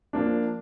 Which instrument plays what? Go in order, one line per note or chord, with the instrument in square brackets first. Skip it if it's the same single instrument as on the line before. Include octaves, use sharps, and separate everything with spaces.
[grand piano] F3 A#3 D4